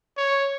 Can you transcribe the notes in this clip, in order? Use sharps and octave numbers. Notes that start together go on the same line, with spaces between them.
C#5